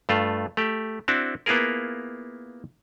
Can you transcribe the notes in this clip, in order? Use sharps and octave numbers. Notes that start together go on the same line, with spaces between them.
G2 A3 F4
A3 G4
C4 D4 E4 F#4
A#3 B3 E4 F4 G#4 A#4